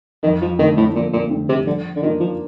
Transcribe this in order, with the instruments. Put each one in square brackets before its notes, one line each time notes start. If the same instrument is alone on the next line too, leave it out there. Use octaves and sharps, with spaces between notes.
[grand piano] F2 [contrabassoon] D#3
[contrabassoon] F3
[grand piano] D3 A3 C4 [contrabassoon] D#3
[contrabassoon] A2
[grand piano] F2 [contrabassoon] A#2
[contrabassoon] A#2
[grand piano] D3 A3 C4
[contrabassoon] C3
[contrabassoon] D3 [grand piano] F3
[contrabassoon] D3
[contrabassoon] D#3 [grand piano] A#3 D4 F4
[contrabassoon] F3